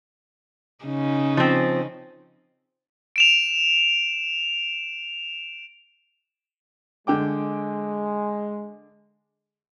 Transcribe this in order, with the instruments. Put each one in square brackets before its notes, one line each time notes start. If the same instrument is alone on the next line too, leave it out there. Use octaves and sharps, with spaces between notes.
[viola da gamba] C#3 C#4 D#4
[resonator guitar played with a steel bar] F3 C4
[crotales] D7 E7 F7
[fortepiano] D3 G5 D6 [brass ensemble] G#3